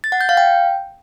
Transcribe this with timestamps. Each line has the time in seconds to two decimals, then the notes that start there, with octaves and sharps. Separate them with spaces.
0.04 A6
0.12 F#5
0.21 G6
0.29 F5
0.37 G5